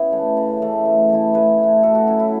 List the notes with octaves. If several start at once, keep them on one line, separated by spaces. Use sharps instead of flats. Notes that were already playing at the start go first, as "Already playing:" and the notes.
Already playing: C#3 B3 E4 B4
E3 A3
C#3
E3 A3
A2
E3 A3 E4
A2 G#4 B4
E3 A3 E4
A2 F#4 A4
F#4
F#3 C#4 E4
E4